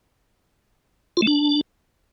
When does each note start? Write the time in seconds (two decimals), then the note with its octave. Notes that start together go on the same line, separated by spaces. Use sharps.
1.17 F4
1.22 A3
1.27 D4